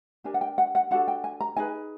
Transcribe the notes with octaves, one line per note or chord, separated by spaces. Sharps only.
D4 G4 A#4 G#5
F#5
G5
F#5
F#5
D4 F#4 A4 F#5
G5
G#5
A#5
D#4 G#4 B4 G#5